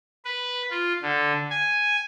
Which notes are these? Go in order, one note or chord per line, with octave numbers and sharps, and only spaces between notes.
B4
F4
D3
G#5